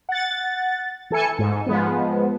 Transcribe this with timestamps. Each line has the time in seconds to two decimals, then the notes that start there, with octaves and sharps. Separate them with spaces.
0.09 F#5 A6
1.11 E3 A4 G#5 C#7
1.39 G#2
1.66 F3 G#3 B3